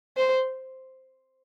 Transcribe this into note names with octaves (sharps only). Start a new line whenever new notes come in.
C5